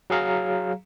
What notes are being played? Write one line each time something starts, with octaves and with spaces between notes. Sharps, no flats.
F#3 G#4 F5 A#5